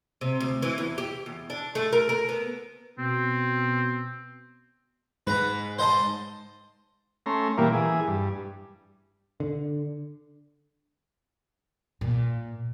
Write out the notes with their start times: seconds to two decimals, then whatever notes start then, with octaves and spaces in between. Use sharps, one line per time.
0.21 C3
0.40 D2
0.62 E3
0.78 E2
0.98 G4
1.26 E2
1.50 D4
1.75 A3
1.93 A#4
2.09 A#4
2.29 B3
2.98 B2 C4
5.27 G#2 B4 A#5
5.79 C5 D#5 A5
7.26 A3 C#4 A#5 C6
7.58 A#2 E3 G3 A#3
7.73 E3 G#4
8.07 G2
9.40 D3
12.01 A#2